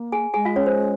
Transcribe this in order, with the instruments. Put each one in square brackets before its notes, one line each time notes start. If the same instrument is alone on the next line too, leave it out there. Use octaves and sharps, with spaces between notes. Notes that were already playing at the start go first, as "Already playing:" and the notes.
Already playing: [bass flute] A#3
[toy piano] G#4 G#5
[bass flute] G#3 [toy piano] G#4 G#5
[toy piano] F4 F5
C#4 C#5
C5